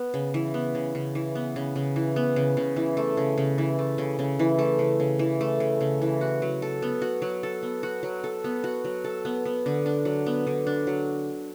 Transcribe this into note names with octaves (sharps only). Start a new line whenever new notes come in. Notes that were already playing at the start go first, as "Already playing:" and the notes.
Already playing: B3
C#3
E3
B3
C#3
C#3
E3
B3
C#3
C#3
E3
B3
C#3
C#3
E3
A3
C#3
C#3
E3
A3
C#3
C#3
E3
A3
C#3
C#3
E3
A3
C#3
C#3
E3
F#4
F#3
A4
B3
F#4
F#3
A4
B3
F#4
F#3
A4
B3
F#4
F#3
A4
B3
B3
D3
D4
F#3
B3
D3
D4
F#3